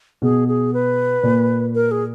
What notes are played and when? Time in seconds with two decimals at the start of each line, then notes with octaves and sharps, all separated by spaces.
0.22 B2 G#4
0.48 G#4
0.74 B4
1.23 A#2
1.75 A#4
1.91 G#4